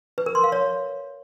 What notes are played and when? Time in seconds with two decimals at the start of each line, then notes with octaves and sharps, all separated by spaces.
0.18 B4
0.26 A#4
0.35 C6
0.44 F5
0.52 C#5